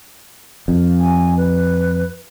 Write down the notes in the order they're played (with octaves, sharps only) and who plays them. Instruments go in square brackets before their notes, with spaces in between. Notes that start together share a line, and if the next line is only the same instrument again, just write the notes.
[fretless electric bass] F2
[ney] G#5
B4